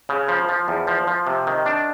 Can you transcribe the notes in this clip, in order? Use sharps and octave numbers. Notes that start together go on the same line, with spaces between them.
C#3
F3
F3
E2
F3
F3
C3
D#3
D4